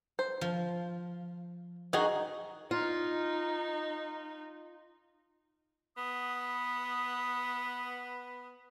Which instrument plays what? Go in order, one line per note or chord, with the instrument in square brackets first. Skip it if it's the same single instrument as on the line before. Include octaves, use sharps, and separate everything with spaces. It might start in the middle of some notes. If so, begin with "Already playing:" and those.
[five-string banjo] C5
[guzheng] F3
[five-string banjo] D#3 F#4 G#4 [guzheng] D#4
[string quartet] D#4 [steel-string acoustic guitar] F4
[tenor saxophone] B3 [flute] D#6